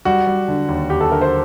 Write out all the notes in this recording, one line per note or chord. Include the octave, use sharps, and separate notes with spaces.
G3 F#4
G3
D3
D#2
D#2 G4
A4
D3 A#4
C5